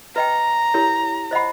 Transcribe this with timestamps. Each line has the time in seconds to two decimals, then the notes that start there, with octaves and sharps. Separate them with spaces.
0.16 B4 D#5 G5 A#5
0.74 E4 G4 A#4 C#5
1.31 C5 D#5 F#5 B5